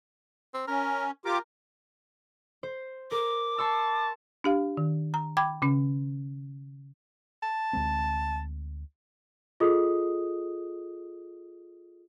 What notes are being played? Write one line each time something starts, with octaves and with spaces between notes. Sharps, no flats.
C4
C#4 A#4
F4 G4 A#4 D6
C5
A#4 D6
A5 C6 C#6 E6
D4 G4 F5
D#3
A#5
G5 B5 D6 G#6
C#3 C#4
A5
D2 G#3 C4
F4 G#4 A4 D#5 D#6